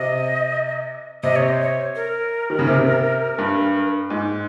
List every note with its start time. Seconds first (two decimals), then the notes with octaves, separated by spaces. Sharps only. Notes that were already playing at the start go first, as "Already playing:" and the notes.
Already playing: C3 D#5
1.23 C3 D#5
1.36 C#5
1.49 C5
1.61 C#5
1.95 A#4
2.50 D#3
2.59 C#3
2.67 C3
3.38 G2
4.10 G#2